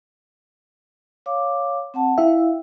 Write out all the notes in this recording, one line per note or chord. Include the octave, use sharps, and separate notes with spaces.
C#5 F5 D6
C4 F#5 A5
E4 E5 F5 G5